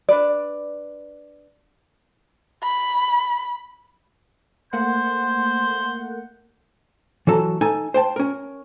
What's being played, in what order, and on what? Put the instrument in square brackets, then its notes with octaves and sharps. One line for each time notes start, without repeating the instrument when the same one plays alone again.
[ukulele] D4 D#4 B4 D5
[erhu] B5
[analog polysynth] A3 A#3 F#5 [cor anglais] C5 [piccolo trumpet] G6
[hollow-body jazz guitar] E3 F#3 A4 A#5
D#4 A4 G#5
C5 G5 A5
C#4 A#4